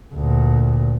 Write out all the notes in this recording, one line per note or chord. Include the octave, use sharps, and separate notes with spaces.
D2 A#2